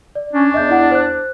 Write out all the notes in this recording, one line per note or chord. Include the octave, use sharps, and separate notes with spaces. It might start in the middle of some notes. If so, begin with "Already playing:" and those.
D5
C#4 D4
E2 D#5 E5 G6
E4 F#5
C5 F#6